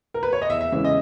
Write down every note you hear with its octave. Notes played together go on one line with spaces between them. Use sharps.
A#4
B4
C#5
D#5
E2 E5
E5
C#3 E3 G#3 C#4 E5
D#5